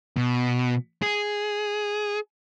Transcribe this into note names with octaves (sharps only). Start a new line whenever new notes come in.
B2
G#4